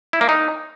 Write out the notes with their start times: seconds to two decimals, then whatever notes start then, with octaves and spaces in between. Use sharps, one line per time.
0.13 E4
0.21 A#3
0.29 D#4